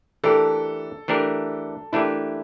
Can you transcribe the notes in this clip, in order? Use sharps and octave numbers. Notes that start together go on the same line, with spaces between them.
E3 A3 D4 G4 A4 A#4
E3 A3 D4 G4 A#4
E3 A3 D4 E4 G4 A#4